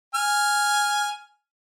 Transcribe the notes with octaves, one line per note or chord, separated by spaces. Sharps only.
G#5 F6